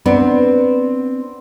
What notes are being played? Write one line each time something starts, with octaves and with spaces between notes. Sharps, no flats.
B3 C4 D4